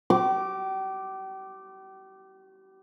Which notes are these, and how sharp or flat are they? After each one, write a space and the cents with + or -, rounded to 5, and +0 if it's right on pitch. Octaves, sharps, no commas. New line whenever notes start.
G4 -40 D6 +0